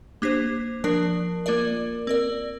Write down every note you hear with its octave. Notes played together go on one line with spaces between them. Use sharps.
A#3 D4 G4 C5
F3 D4 A#4 D5
A#3 F4 A#4 D5
C4 A#4 D5